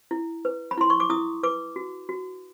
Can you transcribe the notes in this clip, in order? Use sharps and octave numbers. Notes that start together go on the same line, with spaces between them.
E4
B4
B5
E4 C6
C#6
D6
E4 D#6
B4 D6
F#4
F#4